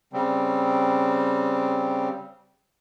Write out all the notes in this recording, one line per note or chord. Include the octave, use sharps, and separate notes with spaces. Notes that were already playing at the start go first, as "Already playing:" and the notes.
C#3 G3 C4